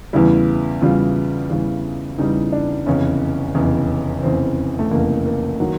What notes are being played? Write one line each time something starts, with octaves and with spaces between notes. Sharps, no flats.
E2 C#3 E3 G3 E4
E2 C#3 E3 G3 F4
E2 C#3 E3 G3
E2 C#3 E3 G3 D#4
D4
F1 E2 C#3 C#4
F1 E2 C#3
F1 E2 C#3 C4
A3
F1 E2 C#3 A#3
A#3
D#3 F#3